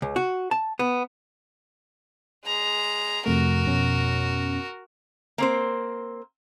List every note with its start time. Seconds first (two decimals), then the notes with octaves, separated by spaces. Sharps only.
0.02 C#2
0.16 F#4
0.51 A5
0.79 B3
2.44 G#3 A#5
3.26 F2 C3 A3 F#4 A#4
3.66 F2 B2 C#4
5.38 A#3 C4 C5